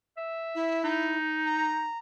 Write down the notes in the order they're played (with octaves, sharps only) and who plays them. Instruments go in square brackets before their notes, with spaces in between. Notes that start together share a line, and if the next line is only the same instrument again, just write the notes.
[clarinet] E5
[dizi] E4
[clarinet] D#4
[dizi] A#5